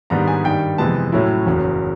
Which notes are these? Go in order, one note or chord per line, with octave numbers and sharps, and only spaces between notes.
G#2 D#3 G3 B3 D4 A#5
G#5
G2 D#3 G3 G5
F2 C3 E3 G#3 B3 A5
A2 F#3 A3 C#4 E4
F#1 E2 C#3 F#3